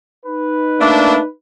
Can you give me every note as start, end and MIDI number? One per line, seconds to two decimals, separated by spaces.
0.25 1.26 63
0.25 1.26 71
0.80 1.18 57
0.80 1.18 58
0.80 1.18 62